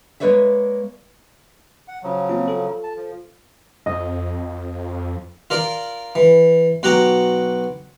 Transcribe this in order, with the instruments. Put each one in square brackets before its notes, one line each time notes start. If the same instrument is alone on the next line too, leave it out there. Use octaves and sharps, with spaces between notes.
[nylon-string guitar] G#3 A#3 B4 C#5 D5 E5
[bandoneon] F#5
C#3 F3 F#3
[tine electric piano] A#3 C4 F4
F4 A4
[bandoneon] A5
F3
[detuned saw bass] F2 [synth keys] D#5
[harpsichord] F4 A#4 D5
E3
B1 F#4 F#5 G5 A#5 D6